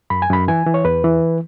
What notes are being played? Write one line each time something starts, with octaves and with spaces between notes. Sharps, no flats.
F#2 B5
G#5
F#2 B5
E3 G#5
E3
C#5
E2 B4
E3